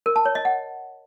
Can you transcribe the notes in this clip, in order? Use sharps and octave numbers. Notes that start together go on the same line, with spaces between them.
A#4
A5
C#5
D#5
F#5